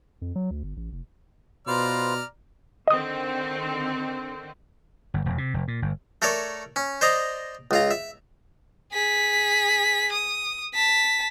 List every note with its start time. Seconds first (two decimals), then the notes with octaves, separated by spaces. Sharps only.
0.22 F2
0.36 F#3
0.51 D2
0.63 G1
0.77 A1
0.93 F1
1.67 B2 F4 B4 C5 D5 A#5 F6
2.88 D3 D#3 C4 D#5 D#6
5.14 G1
5.26 E1
5.38 C3
5.54 F1
5.68 A#2
5.82 G1
6.22 A3 A4 A#4 C#5 D5
6.76 C#4
7.01 C5 D5 D#5 A#5
7.71 C#2 F4 A#5
7.91 E5
8.93 G#4 B6
10.13 D#6
10.74 A5 B6